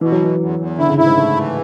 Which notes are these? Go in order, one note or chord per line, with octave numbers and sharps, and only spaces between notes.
B2 E3
F#3
E2 E3
E2
E2
D3 E4
C#3
A2 E4
G#2
G#2 A3
E3